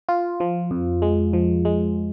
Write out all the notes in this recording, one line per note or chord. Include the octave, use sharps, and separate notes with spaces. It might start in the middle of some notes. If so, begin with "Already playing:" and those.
F4
F3
F2
G#3
F3
G#3